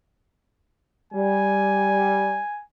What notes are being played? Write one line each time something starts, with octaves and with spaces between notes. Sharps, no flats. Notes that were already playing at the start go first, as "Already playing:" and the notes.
G3 G#5